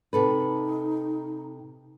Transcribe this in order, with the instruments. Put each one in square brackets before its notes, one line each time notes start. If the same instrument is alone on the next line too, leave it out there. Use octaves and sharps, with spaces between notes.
[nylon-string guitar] C3 A4 B4 [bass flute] D#4